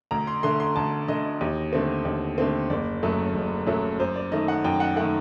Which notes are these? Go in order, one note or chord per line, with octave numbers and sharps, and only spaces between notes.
D2 A#5
C6
D3 A3 C6
C6
D2 A5
D3 A3 D#5
D#2
D3 A3 C4
D#2
D3 A3 C4
F#1 D5
F#2 F#3 A3
F#1
F#2 F#3 A3
F#2 C5
D5
D#3 A3 D#5
F#5
F#2 G5
F#5
D#3 A3 F#5